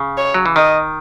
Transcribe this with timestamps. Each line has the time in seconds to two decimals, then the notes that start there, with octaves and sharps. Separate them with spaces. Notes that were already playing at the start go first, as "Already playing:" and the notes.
Already playing: C#3
0.17 C#5
0.34 F#3
0.46 E3
0.56 D#3 D#5